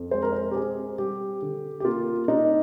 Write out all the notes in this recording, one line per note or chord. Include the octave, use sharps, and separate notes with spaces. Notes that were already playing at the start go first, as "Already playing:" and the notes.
Already playing: F2
G#3 C5
A#4
C5
G4
C4 G#4
G3 G4
D3
G4
A#3 F4
D4 D#4